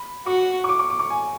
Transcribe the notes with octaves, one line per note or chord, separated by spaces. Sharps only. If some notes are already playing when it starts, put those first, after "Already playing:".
Already playing: B5
F#4 C#6
C#6
D6
C#6
D6
C#6
G#5